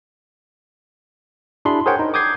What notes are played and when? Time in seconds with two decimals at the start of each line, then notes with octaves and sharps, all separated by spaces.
1.65 D4 E4 F#4 G#4 B5 C6
1.86 G#4 A#4 C5 C#5 F#5 G5
1.99 D#4
2.14 D6 D#6 G6 G#6 C7